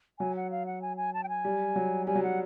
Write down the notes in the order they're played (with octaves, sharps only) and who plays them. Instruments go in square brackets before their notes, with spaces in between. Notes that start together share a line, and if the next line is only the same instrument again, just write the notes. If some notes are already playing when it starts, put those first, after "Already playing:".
[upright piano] F#3 [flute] G#5
[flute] F#5
F5
F#5
G#5
G#5
A5
G5
G#5
[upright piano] G3
F#3
[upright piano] G3 [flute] G#5
[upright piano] F#3
[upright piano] G3 [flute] F#5